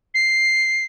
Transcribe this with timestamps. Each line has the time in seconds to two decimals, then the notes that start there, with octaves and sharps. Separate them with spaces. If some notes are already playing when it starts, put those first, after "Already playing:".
0.14 C7